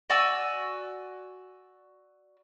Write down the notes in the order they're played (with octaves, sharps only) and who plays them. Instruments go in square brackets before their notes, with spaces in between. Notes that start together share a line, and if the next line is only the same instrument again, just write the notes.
[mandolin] F#4 D5 G#5 E6